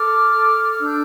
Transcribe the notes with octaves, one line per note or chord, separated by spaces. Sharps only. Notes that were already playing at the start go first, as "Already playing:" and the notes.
Already playing: A4 D6 F6
A4
D4 E6 G6